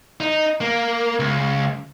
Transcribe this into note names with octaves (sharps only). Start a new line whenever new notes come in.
D#4
A#3
C#2